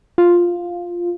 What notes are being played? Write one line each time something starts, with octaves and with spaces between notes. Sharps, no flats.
F4